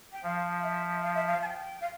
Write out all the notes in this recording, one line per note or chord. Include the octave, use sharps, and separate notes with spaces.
G5
F3 F5
E5
F5
E5
F5
A5
G5
F5